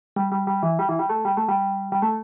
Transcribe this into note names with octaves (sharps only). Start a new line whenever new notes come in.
G3
G3
G3
E3
G3
E3
G3
A3
G3
A3
G3
G3
A3